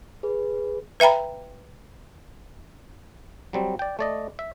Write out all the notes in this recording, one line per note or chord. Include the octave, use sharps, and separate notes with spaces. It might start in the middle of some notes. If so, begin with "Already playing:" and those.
G#4 B4
B4 E5 G5 A#5 B5
F#3 G3 C4
D5 G5
A3 D5 D#5
E5